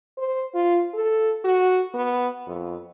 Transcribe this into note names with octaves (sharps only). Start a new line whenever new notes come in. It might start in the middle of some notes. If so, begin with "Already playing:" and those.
C5
F4
A4
F#4
B3
F2